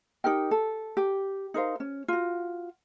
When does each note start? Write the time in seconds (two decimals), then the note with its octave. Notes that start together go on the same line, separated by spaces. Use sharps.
0.24 D#4 G4 A#4 G5
0.51 A4
0.97 G4
1.54 D#4 A#4 C5 F5
1.80 C#4
2.08 F4 F#4